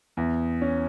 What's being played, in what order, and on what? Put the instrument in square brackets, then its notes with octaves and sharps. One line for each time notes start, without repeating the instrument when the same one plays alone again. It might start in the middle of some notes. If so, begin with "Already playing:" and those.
[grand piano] E2
C#4